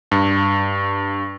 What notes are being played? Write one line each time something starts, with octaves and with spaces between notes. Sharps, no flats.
G2